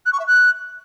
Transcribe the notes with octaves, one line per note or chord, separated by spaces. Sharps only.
F#6
C#6
E5
F#6